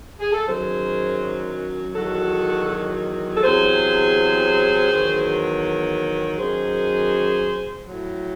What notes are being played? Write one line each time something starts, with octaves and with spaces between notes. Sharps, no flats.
G#4
A4
F#2 D#3 F#3 G#4 C5
E2 D#3 F#3 F#4 A4
A4
E2 C3 F#3 G#4 C5
E2 D#3 F#3
F#2 D#3 F#3 G#4 C5
A2 F#3